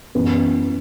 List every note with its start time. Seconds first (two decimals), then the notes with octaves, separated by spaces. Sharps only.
0.15 F#2 E3 B3